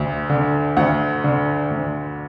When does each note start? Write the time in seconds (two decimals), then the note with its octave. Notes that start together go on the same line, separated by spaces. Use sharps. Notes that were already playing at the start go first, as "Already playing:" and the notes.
Already playing: D2 D3
0.30 D3
0.77 D2 F#5
1.24 D3
1.71 D2